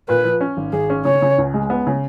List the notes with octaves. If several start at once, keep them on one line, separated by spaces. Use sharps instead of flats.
A#2 B4
F3
C#4
G#1
G#1 G#4
C#4
C#3 C#5
C#3
C#2
G#3
B3
C#3